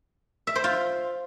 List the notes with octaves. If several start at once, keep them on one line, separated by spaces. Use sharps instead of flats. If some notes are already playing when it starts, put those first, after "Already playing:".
E5
C5
F4